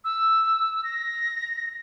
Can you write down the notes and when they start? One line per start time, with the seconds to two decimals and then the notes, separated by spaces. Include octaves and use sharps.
0.04 E6
0.84 A#6